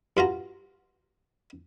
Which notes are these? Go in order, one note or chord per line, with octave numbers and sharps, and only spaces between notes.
G2 F4 F#4 A#5